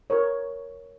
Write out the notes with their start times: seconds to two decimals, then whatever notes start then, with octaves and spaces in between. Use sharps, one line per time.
0.10 A#4 C#5